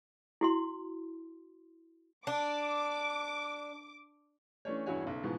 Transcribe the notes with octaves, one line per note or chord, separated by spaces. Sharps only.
E4 F#4 C6
D4 D6
E3 A3 C#4 D4 C#5
E1 G2 E4 F#4 C#5 G#5
F#1 B1
G#2 B2 E3 F3 B3